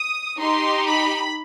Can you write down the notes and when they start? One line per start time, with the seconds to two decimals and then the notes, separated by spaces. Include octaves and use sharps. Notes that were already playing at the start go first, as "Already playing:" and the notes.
Already playing: D#6
0.38 D#4 G4 C6
0.86 B5